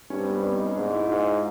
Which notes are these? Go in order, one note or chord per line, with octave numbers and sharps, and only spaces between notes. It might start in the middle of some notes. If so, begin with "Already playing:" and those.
G2 C#4
C4
B3
C4
D4
D#4
C#4
G#2 D4
E4
G#2 F4